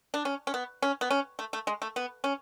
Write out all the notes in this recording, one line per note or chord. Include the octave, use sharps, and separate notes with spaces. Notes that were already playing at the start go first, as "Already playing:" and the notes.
D4
C#4
C#4
B3
C#4
B3
C#4
A3
A3
G#3
A3
B3
C#4